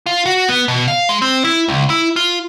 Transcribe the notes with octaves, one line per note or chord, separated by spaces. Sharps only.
F4
F#4
B3
B2
F5
G#3
C4
E4
C#2
E4
F4